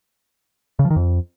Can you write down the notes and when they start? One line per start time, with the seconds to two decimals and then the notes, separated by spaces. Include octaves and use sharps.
0.79 C#3
0.85 F3
0.90 D#3
0.96 F2